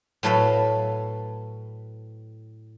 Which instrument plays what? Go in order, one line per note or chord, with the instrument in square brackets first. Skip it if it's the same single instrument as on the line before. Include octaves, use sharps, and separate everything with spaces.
[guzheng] A2 F#3 A4 B4 F5